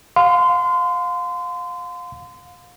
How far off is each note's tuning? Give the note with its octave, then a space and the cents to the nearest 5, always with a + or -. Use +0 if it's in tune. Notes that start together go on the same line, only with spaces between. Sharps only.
F5 +30 C6 -30